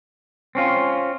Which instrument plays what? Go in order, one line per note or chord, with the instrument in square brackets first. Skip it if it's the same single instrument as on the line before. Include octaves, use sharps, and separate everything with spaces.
[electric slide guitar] C4 C#4 F4